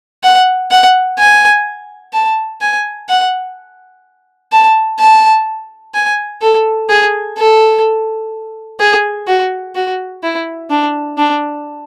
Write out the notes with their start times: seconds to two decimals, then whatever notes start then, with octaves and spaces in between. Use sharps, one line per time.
0.23 F#5
0.71 F#5
1.18 G#5
2.13 A5
2.61 G#5
3.09 F#5
4.52 A5
4.99 A5
5.94 G#5
6.42 A4
6.89 G#4
7.38 A4
8.80 G#4
9.27 F#4
9.75 F#4
10.23 E4
10.70 D4
11.18 D4